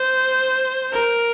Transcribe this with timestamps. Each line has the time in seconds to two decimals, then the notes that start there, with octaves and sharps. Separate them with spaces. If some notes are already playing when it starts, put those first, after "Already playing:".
Already playing: C5
0.93 A#4